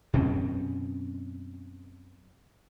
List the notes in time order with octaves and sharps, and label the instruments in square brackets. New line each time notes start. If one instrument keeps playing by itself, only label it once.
[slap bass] F#2 B2 C4 C#4